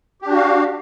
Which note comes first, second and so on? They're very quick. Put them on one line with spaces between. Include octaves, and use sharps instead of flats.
G4 D4 F#4 F5